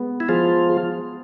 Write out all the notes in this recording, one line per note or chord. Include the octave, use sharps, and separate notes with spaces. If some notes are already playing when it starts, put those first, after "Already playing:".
Already playing: G#3 B3
E4
F3 F4 G#4
G#4